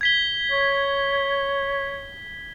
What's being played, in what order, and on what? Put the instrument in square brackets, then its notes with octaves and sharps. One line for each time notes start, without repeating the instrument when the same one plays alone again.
[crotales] G#6 B6 G7
[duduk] C#5